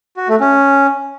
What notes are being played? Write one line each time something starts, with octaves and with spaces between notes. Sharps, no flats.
F#4
A3
C#4